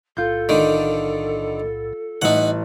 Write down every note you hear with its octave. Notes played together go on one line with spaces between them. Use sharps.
B1 A2 F4 A4 G6
D3 D#3
A1 A3 D#4 F#5